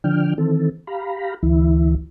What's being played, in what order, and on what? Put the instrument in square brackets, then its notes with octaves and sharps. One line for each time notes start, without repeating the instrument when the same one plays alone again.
[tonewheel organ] D3 F3 D4 G5 F6
D#3 E3 C4 A4
G4 F5 A#5 B5
D2 E3 E4